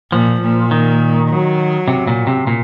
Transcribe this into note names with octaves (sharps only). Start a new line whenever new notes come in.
A#2 F3
A#2
D#3
F#3
C3
A#2
C3
A#2